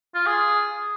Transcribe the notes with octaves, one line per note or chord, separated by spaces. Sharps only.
F4
G#4